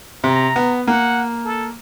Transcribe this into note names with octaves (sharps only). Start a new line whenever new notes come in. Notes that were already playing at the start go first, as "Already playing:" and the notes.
C3 A#5
B3
A#3 F#5
A4